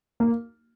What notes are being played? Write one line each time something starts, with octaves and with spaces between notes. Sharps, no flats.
A#3